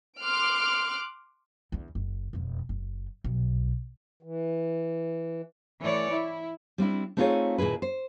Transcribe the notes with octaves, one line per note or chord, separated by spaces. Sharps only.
C6 D6 F6 F#6 D7
E2 D3
F#1
E1 F2
F#1
D#1 B1
E3
E3 A3 C#5 D5
E4
G3 C4 D4 E4
A3 C4 D#4 F4 G#4 C#5
D#2 A#2 E4 G#4 B4
C5